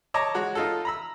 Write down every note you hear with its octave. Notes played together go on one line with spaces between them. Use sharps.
C#5 D#5 A5 A#5 D6
G#3 F#4 C#5
D#4 F4 A4
A#5 B5 E6